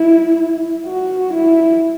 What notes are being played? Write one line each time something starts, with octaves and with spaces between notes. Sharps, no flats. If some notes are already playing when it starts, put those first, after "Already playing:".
Already playing: E4
F#4
E4